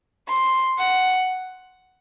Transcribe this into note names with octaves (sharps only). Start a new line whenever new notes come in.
C6
F#5